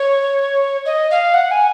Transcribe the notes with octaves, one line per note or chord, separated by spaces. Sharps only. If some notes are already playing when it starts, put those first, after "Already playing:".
Already playing: C#5
D#5
F5
F#5
G#5